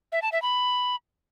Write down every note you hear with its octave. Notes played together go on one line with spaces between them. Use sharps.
E5
A5
E5
B5